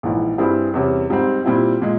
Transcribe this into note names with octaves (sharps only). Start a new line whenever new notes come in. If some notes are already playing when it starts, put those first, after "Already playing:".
A#1 G#2 E3
G2 G3 C4 E4 G#4
E2 C3 G3 C#4
G#2 G3 C4
A#2 G3 C4 E4
A#2 G#3